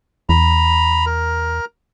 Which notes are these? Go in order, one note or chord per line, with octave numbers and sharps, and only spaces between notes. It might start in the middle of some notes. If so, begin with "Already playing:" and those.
E2 A#5 B5
A#4